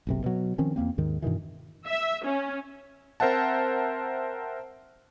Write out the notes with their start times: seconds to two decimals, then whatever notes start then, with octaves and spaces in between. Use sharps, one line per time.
0.07 F#1 B1 C3
0.24 B2 F#3
0.58 D#3 F3 C4 C#4
0.76 E2 G2 A#3 C4
0.98 D#2 G#2 D#3
1.22 G2 B2 D#3 E3
1.87 E5
2.26 C#4
3.20 C4 A#4 C5 E5 F#5 A5